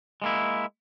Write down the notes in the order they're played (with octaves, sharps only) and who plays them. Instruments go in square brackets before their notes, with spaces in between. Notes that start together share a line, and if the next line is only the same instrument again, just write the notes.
[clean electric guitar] G#3 A#3 E4